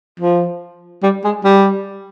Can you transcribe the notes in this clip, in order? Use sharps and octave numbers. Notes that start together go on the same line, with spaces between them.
F3
G3
G#3
G3